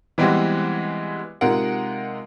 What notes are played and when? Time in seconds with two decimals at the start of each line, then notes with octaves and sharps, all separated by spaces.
0.18 E3 G3 G#3 B3 C4 F#4
1.41 C3 G#3 D#4 F4 A#4 F#5